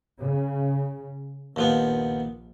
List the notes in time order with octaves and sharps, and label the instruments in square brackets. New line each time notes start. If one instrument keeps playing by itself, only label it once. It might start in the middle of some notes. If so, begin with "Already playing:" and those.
[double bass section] C#3
[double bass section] A#1 [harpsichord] D#2 F3 B3